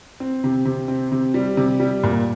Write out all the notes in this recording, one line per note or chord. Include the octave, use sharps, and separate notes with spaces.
C4
C3
C3
C4
C3
G3
C3
G3
A#2